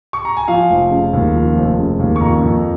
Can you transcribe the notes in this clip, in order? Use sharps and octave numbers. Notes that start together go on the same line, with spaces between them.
C#6
A#5
G#5
F3 F5
F1
C#3
D#2
F3
F1
C#3
D#2
C#6
F2 A#5
F2